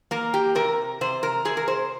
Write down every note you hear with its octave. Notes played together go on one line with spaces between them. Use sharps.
A#3 A#4
G4
C3 A#4
C3 C5
A#4
C3 G#4
A#4
C5